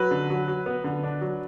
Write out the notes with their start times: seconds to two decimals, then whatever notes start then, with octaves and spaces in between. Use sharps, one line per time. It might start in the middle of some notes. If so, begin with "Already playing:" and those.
Already playing: F#3 B4
0.11 D3
0.30 F#3
0.48 F#3
0.66 B3
0.84 D3
1.04 D4
1.21 F#3